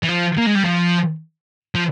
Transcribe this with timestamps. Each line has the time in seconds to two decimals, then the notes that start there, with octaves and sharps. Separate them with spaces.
0.03 E3
0.09 F3
0.38 A#3
0.47 G#3
0.55 G3
0.64 F3
1.75 F3